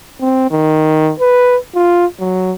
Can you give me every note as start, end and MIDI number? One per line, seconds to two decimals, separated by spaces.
0.21 0.49 60
0.51 1.12 51
1.20 1.57 71
1.75 2.06 65
2.20 2.53 54